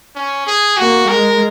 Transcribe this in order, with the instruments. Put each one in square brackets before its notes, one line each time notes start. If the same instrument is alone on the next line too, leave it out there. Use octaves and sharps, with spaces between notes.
[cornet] C#4
G#4
[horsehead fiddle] A#3 [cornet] F#4
[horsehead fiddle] G#3 [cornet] A#4